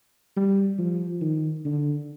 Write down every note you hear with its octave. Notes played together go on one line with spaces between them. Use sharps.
G3
F3
D#3
D3